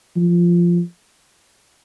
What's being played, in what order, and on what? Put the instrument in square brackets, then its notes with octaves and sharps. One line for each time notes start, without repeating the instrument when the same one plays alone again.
[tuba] F3